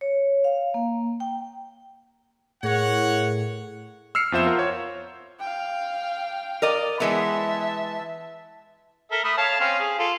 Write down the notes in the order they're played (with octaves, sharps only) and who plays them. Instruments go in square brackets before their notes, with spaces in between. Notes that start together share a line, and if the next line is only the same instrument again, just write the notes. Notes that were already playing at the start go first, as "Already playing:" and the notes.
[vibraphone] C#5
F5
A#3
G5
[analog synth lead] A2 [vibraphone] G#4 A#4 [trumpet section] C#5 F#5
[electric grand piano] E6 F6 C7 C#7
F2 B3 F4 C5 E5 E7
F4 A#4 F#5
C#5
[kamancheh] F5 G5
[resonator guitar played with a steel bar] A#4 D5 D#5
[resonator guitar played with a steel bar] E3 G#3 B3 [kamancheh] E5 A5
[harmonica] A4 A#4 E5
A3 B5 D#6
C#5 F5 A5
C4 C#4 F5
G#4
F4 A4